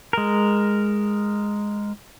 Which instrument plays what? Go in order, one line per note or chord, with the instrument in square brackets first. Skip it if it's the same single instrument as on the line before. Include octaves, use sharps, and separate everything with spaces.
[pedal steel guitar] G#3 A#4